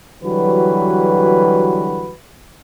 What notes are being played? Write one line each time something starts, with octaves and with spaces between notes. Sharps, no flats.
D3 E3 F#3 G3 F#4 B4